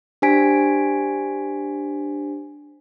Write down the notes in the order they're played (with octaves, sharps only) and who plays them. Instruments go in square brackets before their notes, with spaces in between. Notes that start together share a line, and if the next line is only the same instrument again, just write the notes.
[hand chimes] D4 G4 C5 G#5 B6 D7